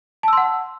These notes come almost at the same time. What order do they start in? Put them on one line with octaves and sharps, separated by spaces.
A5 E6 C6 F#5